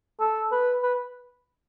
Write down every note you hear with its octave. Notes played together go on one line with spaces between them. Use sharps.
A4
B4
B4